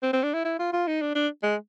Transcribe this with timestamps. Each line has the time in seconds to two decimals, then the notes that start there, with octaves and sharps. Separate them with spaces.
0.03 C4
0.13 C4
0.23 D4
0.34 E4
0.45 E4
0.59 F4
0.73 F4
0.87 D#4
1.02 D4
1.15 D4
1.43 G#3